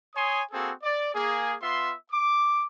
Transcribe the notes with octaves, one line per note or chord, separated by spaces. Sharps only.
C#5 G#5 C6 D#6
A#3 C4 F#4 G#4 A4
D5
A#3 G#4
B3 F4 E5 C6
D6